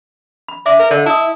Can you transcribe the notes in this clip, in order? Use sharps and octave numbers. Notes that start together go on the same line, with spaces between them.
B5
D4 E5 D6
A#4
D3 D#5
E4 A5 D#6